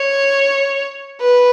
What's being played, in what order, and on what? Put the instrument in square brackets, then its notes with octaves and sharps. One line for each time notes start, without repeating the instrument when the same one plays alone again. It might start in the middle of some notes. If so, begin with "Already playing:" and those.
Already playing: [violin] C#5
B4